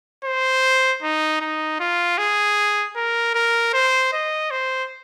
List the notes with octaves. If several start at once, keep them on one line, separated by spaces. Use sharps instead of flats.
C5
D#4
D#4
F4
G#4
A#4
A#4
C5
D#5
C5